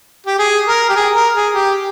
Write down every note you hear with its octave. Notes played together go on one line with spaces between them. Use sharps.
G4
G#4
A#4
G4
G#4
A#4
G#4
G4